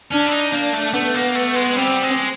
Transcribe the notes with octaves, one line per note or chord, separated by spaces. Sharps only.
C#4 D4
E4
D#4
A#3 D4
A3
A3 B3
A#3
A3
G#3
G3 C4
G#3